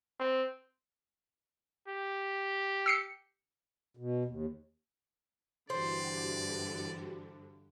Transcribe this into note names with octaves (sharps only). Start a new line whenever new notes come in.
C4
G4
E6 C7 C#7
B2
D#2
G2 D3 E3 F#4 G4 C5 D5